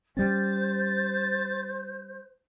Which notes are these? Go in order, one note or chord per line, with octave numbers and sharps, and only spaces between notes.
G3 C#4 C5 A6